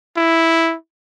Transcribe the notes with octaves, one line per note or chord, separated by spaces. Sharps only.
E4